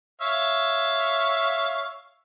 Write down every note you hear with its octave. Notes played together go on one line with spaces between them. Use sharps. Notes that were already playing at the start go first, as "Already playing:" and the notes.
C#5 E5 F5